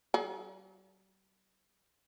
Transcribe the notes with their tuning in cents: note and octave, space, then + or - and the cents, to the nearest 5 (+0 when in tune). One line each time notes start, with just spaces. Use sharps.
G3 -45 G#4 +45